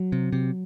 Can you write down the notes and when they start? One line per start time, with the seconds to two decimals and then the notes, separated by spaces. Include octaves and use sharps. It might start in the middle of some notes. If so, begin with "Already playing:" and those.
Already playing: F#3
0.12 C3
0.33 C3